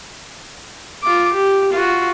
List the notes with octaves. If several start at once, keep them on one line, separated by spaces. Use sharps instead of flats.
F4 D6
G4
F4 F#4